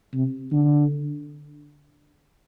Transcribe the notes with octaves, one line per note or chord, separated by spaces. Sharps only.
C3
D3